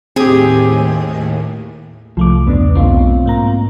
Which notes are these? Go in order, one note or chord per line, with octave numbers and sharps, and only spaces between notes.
D#2 A2 C4 G4 G#4
C2 F3 A3 D6
E2 G2 C#3 B3 D4
B1 B2 A3 C4 C#4 F4
G#2 A#3 A#5